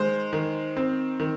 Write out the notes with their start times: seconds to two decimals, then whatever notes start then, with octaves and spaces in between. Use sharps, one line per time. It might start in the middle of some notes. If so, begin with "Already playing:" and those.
Already playing: D#3 G#3 C5
0.33 D#3
0.77 C4
1.20 D#3